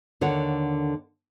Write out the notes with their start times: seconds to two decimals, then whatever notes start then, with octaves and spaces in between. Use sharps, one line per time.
0.21 D#2 D3 C#5 F#5